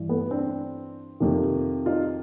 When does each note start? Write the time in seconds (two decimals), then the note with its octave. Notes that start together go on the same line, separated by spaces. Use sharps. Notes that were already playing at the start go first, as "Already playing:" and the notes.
Already playing: G2 E3
0.09 A3 B3
0.31 C4 D4
1.20 F2 C3 D#3
1.86 D#4 F4